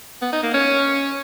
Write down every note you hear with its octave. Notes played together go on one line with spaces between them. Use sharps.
B3
D#4
A#3
C#4